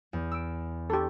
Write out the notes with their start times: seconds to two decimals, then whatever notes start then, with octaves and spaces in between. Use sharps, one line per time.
0.13 E2
0.32 E6 D7
0.90 D4 G4 A4 C6 C#6